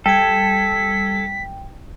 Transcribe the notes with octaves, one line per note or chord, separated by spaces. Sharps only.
G3 A4 G5 G#6 B6